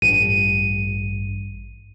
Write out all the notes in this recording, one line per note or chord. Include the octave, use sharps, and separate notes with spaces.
A1 G2 D#7